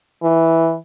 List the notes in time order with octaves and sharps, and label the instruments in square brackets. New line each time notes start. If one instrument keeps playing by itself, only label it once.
[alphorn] E3